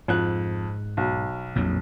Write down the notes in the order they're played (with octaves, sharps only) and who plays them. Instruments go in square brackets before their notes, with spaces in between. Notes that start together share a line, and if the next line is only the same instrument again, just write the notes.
[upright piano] F2 F#6 [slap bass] G#2
[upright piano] B1
[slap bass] A#1 F2 F#3